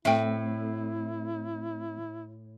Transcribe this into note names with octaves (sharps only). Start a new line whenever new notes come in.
A2 A3 C4 E4 E5 G5